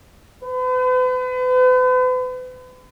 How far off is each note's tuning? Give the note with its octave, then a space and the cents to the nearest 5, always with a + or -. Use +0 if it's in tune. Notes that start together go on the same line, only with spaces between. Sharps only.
B4 +40